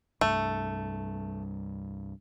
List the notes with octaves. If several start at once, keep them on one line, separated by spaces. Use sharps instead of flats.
C2 G2 A3